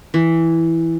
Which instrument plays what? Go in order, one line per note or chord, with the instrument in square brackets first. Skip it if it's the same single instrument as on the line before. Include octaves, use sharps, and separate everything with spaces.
[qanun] E3